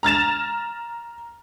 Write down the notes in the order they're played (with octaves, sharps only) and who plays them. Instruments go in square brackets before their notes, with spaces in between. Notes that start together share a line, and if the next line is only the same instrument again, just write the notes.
[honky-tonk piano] A#5 F6 A6 E7